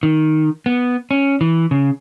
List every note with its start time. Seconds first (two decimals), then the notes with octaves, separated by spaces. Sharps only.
0.03 D#3
0.66 B3
1.11 C#4
1.41 E3
1.71 C#3